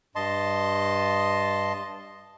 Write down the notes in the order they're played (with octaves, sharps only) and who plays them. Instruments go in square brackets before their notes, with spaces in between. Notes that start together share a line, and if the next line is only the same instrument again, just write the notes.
[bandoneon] G2 D#5 A5 C6